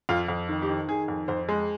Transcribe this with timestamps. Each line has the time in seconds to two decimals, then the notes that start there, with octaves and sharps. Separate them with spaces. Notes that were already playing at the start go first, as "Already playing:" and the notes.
0.09 F2 F4
0.28 F2
0.48 D#3
0.62 G4
0.69 D#3
0.88 D#3 G#4
1.08 F2
1.28 F2 C5
1.49 G#3